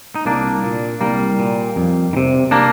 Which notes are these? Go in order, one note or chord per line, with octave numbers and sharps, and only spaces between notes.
D#4
C2 A#3 D4
A#2
C2 G3 A#3
A#2
F2
D#3
C3
A#3 D4